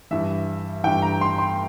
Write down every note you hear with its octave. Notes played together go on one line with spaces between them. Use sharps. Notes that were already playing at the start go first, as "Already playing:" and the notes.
G2 E3 E5
G2 E3 G5
A#5
C6
C6